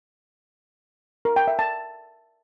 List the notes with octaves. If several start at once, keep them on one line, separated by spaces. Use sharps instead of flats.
A#4
G5
E5
A5